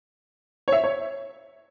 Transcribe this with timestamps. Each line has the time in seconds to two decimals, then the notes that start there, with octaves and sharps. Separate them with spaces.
0.68 C#5
0.72 E5
0.84 C#5